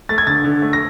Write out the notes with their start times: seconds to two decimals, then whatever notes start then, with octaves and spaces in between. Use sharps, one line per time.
0.09 A3 A6
0.18 G#6
0.27 D3 A6
0.44 D3
0.62 A3
0.73 A#6